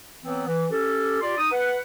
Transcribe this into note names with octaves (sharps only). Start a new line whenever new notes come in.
E3 F#3 B3 C4
E3
C#4 G4 A4
F4 G4 D5 C6
D#4 D#6
B4 F#5